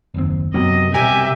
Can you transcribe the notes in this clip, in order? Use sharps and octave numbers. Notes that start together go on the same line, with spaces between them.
F#1 D#2 C4
F#2 C3 B3 C#4 D#5
C2 G2 B2 G4 A#4 E5 G#5